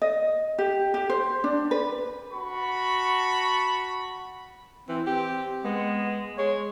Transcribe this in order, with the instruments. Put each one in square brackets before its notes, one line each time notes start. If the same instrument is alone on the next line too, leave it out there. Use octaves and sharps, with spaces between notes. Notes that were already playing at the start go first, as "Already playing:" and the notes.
[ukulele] D#5
G4
G4
C5
D4
B4
[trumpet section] F#4 A5 B5 C#6
[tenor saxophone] E3 [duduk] C4
[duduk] C4 [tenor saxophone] G4
[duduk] G#3 [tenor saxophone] B3
[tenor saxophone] G#3 [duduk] C#5